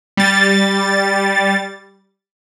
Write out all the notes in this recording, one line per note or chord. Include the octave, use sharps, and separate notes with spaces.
G3 A6